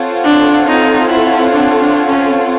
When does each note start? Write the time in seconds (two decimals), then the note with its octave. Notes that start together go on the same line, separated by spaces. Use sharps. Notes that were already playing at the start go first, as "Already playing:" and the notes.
Already playing: C4 F4 A4 C#5 F#5
0.24 D4
0.67 D#4
1.09 E4
1.52 D4
1.79 D4
2.08 C#4